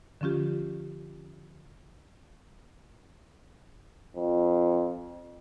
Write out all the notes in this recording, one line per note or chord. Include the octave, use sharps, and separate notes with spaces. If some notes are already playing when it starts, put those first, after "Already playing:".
D3 F3 C#4 F4 G4
F2